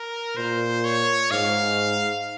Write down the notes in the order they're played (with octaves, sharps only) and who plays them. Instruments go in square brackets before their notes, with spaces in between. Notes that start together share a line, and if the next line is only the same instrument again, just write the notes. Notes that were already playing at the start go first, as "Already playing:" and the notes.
Already playing: [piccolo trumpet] A#4
[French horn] A#2 [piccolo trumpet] C5
[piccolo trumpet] C#5
[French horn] G#2 [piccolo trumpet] F5